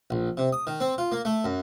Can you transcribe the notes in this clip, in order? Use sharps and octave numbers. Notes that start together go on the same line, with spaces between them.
A#1
C3
D#6
D#3
C4
F4
A#3
A3
F#2